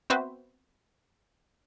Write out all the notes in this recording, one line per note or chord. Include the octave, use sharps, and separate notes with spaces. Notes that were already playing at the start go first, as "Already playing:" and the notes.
B3 C4 F#4 B4 C5 E5